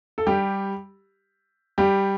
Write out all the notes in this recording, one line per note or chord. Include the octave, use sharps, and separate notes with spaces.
A4
G3 G4
G3 G4